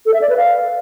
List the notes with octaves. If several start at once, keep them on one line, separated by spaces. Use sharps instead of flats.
A4
E5
D5
B4
F5